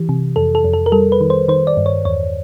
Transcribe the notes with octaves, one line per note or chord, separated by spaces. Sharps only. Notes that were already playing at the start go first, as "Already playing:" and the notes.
Already playing: E3 G4
C3
F2 A4
A4
F2
A4
A#4
G3 A4
B4
D#3
C5
D#3 C5
D5
G2
C#5
E2 C#5